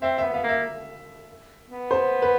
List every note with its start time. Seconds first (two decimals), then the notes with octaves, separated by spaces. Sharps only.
0.02 C4 E5
0.18 E5
0.23 B3
0.34 B3 F5
0.44 A#3
0.49 E5
1.70 B3
1.91 C5
2.22 B4